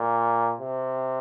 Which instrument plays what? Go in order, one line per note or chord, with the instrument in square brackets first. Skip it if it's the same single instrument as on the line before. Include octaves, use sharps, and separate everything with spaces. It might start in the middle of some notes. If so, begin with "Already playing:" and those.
Already playing: [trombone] A#2
C3